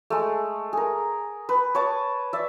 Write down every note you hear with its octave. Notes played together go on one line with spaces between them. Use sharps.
G#3 A3
G#4 A#4
B4
C#5 A5 D6
D5 E5